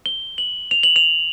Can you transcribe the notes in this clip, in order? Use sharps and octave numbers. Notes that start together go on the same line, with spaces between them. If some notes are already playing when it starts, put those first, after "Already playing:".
G7
F#7
F7
F#7
F7